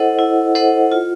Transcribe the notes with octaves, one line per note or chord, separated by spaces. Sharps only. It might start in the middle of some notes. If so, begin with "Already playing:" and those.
Already playing: E4 A4 C5 D#5 F#5
E4
A4 C5 D#5 F#5
F4